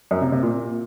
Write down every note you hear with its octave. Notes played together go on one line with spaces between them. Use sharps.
F#2
C3
C3
A#2